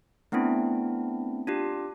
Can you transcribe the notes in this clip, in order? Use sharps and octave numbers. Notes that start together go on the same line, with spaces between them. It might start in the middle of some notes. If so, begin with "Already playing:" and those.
A3 B3 C4 D4 E4
D4 F4 G4